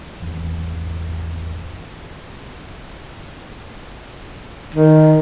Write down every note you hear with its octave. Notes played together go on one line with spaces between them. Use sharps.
G#1 E2
D#3